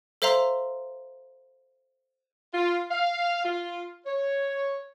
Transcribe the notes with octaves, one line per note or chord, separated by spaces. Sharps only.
A4 C5 E5 F5 A#5 C6
F4
F5
F4
C#5